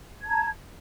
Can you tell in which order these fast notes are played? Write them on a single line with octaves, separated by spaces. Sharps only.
G#6 A5 A#5